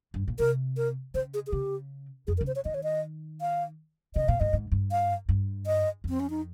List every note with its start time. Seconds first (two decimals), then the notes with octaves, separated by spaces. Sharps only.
0.14 G2
0.28 A#2
0.39 C3 A#4
0.77 A#4
1.14 C#3 C5
1.34 G#4
1.47 G#4
1.52 C#3 G4
2.27 F2 G#4
2.38 A#4
2.41 C#3
2.47 C5
2.56 C#5
2.65 D#3 D#5
2.74 C#5
2.83 D#5
3.41 F5
4.15 C#3 D#5
4.28 A#2 F5
4.40 G#2 D#5
4.53 G#2
4.72 G2
4.92 F5
5.29 G2
5.67 D#5
6.04 F2
6.09 C4
6.20 C#4
6.30 D#4